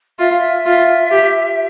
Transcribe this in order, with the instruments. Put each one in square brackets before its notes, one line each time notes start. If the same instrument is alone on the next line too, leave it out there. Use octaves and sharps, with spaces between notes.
[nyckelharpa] F4 [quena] E5
[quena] F5
E5
[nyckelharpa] F4
G4